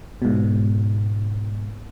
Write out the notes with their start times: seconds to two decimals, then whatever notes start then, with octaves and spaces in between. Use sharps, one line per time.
0.22 G#2 B2